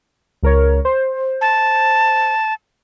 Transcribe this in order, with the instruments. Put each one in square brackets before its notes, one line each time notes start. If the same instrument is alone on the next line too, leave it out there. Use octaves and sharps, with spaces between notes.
[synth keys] C#2 A#4 C#5
C5
[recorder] A5